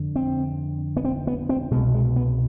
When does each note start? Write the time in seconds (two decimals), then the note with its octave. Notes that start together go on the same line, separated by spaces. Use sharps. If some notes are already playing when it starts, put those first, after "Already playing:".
Already playing: F2 D3
0.16 C4
0.97 B3
1.05 C4
1.27 B3
1.49 C4
1.71 B2 G#3
1.76 C2
1.94 G#3
2.16 B3